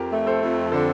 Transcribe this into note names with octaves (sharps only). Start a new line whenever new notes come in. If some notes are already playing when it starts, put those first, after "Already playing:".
Already playing: F2 G4 A#4
A3
A4 C5
F2
D3 A4 C5